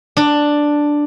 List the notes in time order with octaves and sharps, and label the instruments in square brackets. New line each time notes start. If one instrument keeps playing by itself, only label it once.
[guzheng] D4